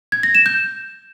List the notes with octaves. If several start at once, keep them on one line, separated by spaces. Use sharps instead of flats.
G#6
A#6
E7
G6